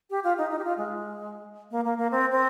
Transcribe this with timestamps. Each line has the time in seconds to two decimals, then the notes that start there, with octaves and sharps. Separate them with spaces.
0.10 G4
0.24 F4
0.38 D#4
0.50 D#4
0.59 G4
0.64 F4
0.77 G#3
1.71 A#3
1.85 A#3
1.98 A#3
2.11 C4
2.32 C4